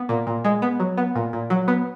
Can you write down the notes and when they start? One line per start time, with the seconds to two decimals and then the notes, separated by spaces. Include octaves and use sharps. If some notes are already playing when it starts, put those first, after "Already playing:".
Already playing: B3
0.09 A#2
0.27 A#2
0.45 G#3
0.62 B3
0.80 F#3
0.98 B3
1.15 A#2
1.33 A#2
1.50 F#3
1.68 B3